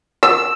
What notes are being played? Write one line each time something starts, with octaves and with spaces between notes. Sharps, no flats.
E6